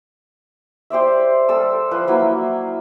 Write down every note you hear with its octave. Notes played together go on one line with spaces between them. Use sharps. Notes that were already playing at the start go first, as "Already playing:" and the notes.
G4 C5 D5 E5
G3 A4 E6
F3 B4
F#3 A#3 E4